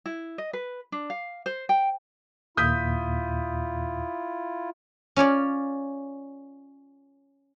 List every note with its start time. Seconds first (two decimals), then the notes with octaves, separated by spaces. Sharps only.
0.06 E4
0.38 D#5
0.53 B4
0.92 D4
1.10 F5
1.46 C5
1.69 G5
2.57 D#2 A#2 E4 F4 D#6 G6 B6
5.16 C#4 F4 C#5 D5